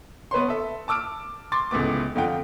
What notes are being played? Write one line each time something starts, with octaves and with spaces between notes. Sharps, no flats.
B3 B4 C#5 C6
A4 E5
A5 D6 E6 F6 D7
C6 D6 A6
D1 C#2 A2 B3 D6
F2 D3 F4 F#5 G5